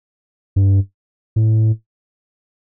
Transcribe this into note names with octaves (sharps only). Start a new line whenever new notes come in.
G2
A2